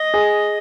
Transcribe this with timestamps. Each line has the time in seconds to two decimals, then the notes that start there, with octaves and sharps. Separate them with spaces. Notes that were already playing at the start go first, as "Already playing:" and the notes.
Already playing: D#5
0.14 G#4